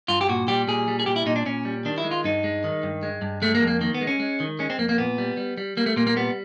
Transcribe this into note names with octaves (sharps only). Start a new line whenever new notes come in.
G2 F4
G4
A#2 F#4
G3 G4
A#2 G#4
G3
G#4
A#2 G4
E4
A#2 D#4
D4
A#2 C#4
G3
D#3 D4
E4
G#3
F4
G2 D#4
G#3
D#3
G2
G#3
G2
G#3 A3
A#3
F2
A#3
D#3 A#3
B3
G#3
C#4
G#3
D#3
G#3 C#4
C4
F2 A#3
A#3
A#2 B3
G3
G3
G3
G3 A#3
A3
A#2 A#3
A#3
G3 B3